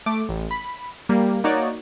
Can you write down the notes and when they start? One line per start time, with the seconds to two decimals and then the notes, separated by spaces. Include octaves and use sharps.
0.06 A3 D6
0.29 A1
0.51 B5
1.09 G3 A#3
1.44 A#3 D#4 F#4 C#5 D5